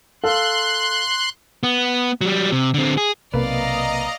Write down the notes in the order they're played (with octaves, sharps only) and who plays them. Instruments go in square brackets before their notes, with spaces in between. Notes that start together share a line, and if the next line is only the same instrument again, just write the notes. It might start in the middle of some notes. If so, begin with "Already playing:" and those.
[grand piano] A4 F5 [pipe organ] C6 F#6
[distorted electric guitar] B3
F#3 G3
C3
D3 C4
G#4
[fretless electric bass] B1 C3 [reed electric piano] A#3 B4 [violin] D5 F5 [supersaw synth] D#5 A#5